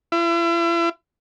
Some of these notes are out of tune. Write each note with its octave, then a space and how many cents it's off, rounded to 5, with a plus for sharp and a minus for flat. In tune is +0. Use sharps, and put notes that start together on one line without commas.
E4 +40